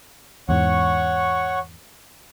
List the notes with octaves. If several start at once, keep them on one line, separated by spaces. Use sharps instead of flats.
E2 G#2 C#5 F#5 C#6